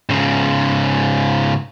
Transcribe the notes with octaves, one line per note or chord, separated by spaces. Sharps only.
G#2 C#3